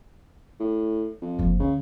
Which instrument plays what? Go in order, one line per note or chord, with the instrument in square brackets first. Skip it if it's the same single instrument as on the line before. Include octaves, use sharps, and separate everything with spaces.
[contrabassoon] A2
F2
[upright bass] F#1 F3
[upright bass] D2 [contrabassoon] C#3